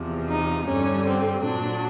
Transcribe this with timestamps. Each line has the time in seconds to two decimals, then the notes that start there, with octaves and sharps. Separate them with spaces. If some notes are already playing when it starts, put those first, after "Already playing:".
Already playing: E2 C3 F3
0.28 D#4
0.67 G2 D3 G3 C#4
1.06 C4
1.44 A#2 F#3 D4